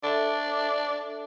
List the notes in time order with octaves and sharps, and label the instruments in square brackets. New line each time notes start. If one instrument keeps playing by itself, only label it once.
[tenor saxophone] D4 [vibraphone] A4 E5